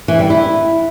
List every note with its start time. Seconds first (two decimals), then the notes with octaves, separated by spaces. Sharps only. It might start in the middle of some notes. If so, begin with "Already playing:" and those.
0.08 E3
0.19 G3
0.30 E4